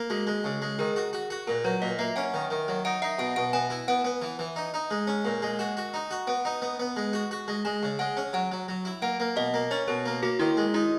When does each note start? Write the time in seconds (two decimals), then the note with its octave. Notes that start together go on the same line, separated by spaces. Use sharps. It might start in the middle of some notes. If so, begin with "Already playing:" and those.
Already playing: A#3
0.10 G#3 F#4
0.27 G#3
0.44 C#3
0.62 G#3
0.79 D#3 G#4
0.96 F#4
1.13 F#4
1.30 F#4
1.47 A#2 A#4
1.64 F#3 B4
1.82 A#2 D#5
1.99 A#3 E5
2.16 C#4 F#5
2.34 D#3
2.50 D#3
2.68 F#3
2.85 D#4 F#5
3.02 D#4 E5
3.19 B2 F#5
3.36 B2 F#5
3.53 B3 G#5
3.70 E4
3.88 B3 F#5
4.05 B3
4.22 E3
4.39 E3
4.56 D#4
4.74 D#4
4.91 G#3
5.07 C#4
5.25 A#2
5.42 G#3
5.59 F#4 G#5
5.77 F#4
5.94 D#4
6.11 F#4
6.27 B3 F#5
6.45 D#4
6.62 B3
6.79 B3
6.96 G#3
7.13 F#4
7.31 F#4
7.48 G#3
7.65 G#3 G#5
7.83 C#3
7.99 G#3 F#5
8.17 C#4
8.33 F#3 F#5
8.52 F#3
8.68 F#3
8.85 E4
9.02 A#3 F#5
9.20 A#3
9.36 B2 D#5
9.54 A#3
9.71 C#4 C#5
9.88 B2 A#4
10.06 A#3
10.23 A#3 F#4
10.39 D#3 E4
10.57 G#3
10.74 D#4 E4